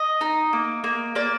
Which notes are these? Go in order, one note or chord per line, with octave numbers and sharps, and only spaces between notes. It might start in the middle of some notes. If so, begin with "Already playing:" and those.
Already playing: D#5
D#4
A#3
A#3
A#3 D5